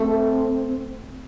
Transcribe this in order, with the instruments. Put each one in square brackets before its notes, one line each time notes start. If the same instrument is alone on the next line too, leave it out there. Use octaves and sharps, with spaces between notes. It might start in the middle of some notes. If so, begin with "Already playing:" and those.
Already playing: [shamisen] A3 A4 [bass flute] C4